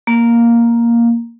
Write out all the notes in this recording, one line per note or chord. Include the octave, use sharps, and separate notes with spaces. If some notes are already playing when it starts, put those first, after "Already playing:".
A#3